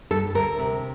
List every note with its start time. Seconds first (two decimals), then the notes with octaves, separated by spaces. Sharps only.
0.11 G2 A4
0.35 D2 A#4
0.59 C3